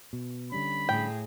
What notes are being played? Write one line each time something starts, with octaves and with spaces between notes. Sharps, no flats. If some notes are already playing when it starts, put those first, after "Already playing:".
B2
D3 G3 C#4 B5
A2 G#4 G5